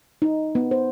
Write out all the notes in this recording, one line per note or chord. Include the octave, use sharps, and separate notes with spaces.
D#4
B3
C5